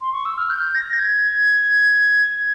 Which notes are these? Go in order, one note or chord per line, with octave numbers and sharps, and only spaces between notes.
C6
C#6
E6
F6
G6
A#6
G6
G#6